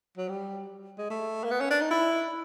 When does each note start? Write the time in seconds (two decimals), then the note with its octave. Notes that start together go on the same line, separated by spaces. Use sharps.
0.17 F#3
0.29 G3
0.98 G#3
1.10 A3
1.44 A#3
1.51 B3
1.61 C#4
1.71 D4
1.81 D#4
1.91 E4